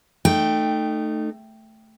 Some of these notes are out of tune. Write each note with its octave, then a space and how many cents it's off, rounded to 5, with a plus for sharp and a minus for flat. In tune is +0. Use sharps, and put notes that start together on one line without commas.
A3 +10 D#4 -20 G5 +0